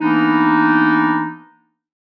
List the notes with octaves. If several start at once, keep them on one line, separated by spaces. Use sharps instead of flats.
E3 A#3 B3 D4 D#4